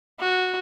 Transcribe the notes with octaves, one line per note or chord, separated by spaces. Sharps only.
F#4